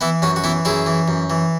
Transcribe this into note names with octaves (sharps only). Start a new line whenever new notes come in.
E3 B3 E4
F#2 C#4 F#4
F#4
E3 B3 E4
F#2 E4 G#4
E3
F#2
E3